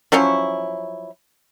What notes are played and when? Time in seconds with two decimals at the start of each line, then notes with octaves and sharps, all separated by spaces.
0.12 F3 F#3 C#4 E4